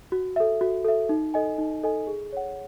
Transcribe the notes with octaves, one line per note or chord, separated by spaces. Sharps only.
F#4
A4 E5
F#4
A4 E5
D#4
A4 D#5 G#5
D#4
A4 D#5 G#5
G#4
C#5 F#5